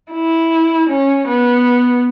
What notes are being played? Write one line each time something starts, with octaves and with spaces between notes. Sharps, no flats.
E4
C#4
B3